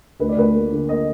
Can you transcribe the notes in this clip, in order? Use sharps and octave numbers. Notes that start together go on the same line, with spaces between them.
D2 B4
D5
D2 B4
A#3
D3
A#3 D#5